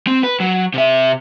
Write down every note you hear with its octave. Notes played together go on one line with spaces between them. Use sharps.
C4
B4
F#3
C3 E5